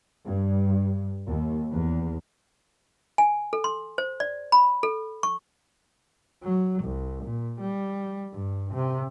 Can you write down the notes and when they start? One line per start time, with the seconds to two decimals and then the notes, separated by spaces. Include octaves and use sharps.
0.24 G2
1.26 D#2
1.72 E2
3.18 G#5
3.53 A4
3.64 C6
3.98 C5
4.20 D5
4.52 B5
4.83 A4
5.23 C#6
6.43 F#3
6.83 C2
7.24 A#2
7.60 G3
8.33 G2
8.73 C3